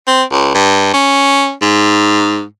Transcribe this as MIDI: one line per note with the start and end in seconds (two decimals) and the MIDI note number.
0.08 0.23 60
0.32 0.50 37
0.55 0.94 43
0.94 1.53 61
1.62 2.44 44